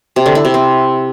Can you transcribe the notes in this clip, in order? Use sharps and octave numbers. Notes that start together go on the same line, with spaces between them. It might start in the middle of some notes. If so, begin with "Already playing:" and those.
C3
D3
E4
C3
C4